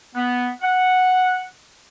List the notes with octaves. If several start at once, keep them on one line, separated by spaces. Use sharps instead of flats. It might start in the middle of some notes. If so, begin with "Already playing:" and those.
B3
F#5